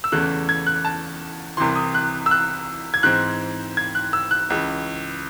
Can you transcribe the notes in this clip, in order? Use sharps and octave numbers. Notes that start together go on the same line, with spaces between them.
E6
E2 C#3 E3 A3 F#6
G#6
F#6
A5
C2 C3 E3 C6
D#6
F#6
E6
F#6
G#6
G#2 E3 C4 F#6
G#6
F#6
E6
F#6
C#2 C#3 E3